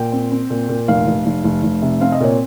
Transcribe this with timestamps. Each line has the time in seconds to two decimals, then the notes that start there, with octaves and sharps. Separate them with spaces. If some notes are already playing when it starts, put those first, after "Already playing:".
Already playing: A#2 G5
0.12 C4
0.31 C4
0.50 A#2
0.69 A#2
0.88 F1 F5
1.07 F1
1.26 F1
1.44 F1
1.63 F1
1.82 C3
2.01 C4 F5
2.12 D#5
2.20 A#2 C#5